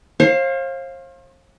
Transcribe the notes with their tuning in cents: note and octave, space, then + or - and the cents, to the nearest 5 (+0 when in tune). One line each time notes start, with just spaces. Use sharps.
C5 +45 F5 +0